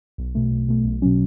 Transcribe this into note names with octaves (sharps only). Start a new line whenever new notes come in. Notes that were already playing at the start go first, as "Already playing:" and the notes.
B1
B2 A3
B1
B2 A3
B1
B2 F#3 C#4